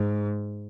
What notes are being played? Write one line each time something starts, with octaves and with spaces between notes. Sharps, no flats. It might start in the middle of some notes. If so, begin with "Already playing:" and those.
Already playing: G#2